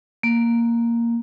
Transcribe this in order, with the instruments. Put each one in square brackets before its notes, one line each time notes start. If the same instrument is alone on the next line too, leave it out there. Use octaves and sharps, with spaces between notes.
[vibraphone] A#3